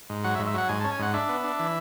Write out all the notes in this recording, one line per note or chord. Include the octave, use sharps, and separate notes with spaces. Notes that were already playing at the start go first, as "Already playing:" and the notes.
G#2
F#3 F#5
E5
G#2
E5
F#3 F#5
G#2 G#5
C#4 A5
G#5
G#2 F#5
D4 E5
B3
D4
E3